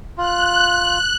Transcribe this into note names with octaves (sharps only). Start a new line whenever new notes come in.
F4 F#6